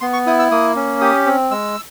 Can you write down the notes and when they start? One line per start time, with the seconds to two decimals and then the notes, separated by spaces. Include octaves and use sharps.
0.01 B3 C6
0.13 C#6
0.26 E4 D#6
0.39 E6
0.51 A#3 D#6
0.76 C#4
1.01 G4 D#6
1.26 C4
1.51 G#3 E6